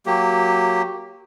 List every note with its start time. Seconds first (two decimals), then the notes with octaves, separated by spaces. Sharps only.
0.06 F#3 A#3 G4